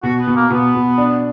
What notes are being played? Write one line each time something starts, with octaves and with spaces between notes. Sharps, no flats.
B2 F#4
B3
B2
A#3
B2 B3
B2
D4